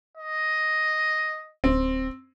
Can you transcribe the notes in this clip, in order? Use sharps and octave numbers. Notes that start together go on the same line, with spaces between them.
D#5
D1 C4